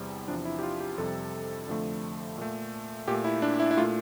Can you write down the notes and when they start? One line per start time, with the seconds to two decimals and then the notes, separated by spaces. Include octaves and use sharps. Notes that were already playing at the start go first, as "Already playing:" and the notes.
Already playing: E2 C3 G3
0.28 E2 C3 F3 D4
0.45 E4
0.59 G4
0.63 F4
0.80 G4
0.98 F2 C3 G3 A4
1.68 F2 D3 F3 A3
2.38 A#2 A3
3.08 A#2 A3 G4
3.24 E4
3.42 D4
3.60 E4
3.71 E4
3.77 A3 F4
3.82 A#2